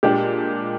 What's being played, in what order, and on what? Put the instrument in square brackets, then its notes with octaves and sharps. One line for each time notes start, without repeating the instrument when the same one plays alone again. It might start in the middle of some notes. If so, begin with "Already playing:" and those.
[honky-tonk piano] A#2 G#3 D4 [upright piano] G4